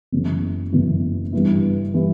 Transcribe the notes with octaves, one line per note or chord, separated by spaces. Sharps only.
F#1 F#2 C#3 E3
F#1 F#2 C#3 E3
G2 E3 G3 B3 E4
E3 G3 B3 E4